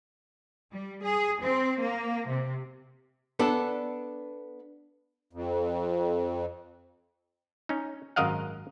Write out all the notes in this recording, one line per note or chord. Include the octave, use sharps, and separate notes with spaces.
G3
G#4
C4
A#3
C3
B3 D4 A4
F2
C#4 D#4
G#1 F#2 A#4 D#5 F5 F#5